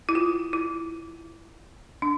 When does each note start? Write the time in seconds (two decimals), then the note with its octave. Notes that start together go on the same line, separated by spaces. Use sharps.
0.09 E4
0.15 F4
0.53 E4
2.02 D4